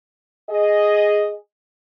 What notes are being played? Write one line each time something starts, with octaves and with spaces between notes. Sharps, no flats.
G#4 D#5